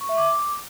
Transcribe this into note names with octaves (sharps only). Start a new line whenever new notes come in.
C#6
E5
D6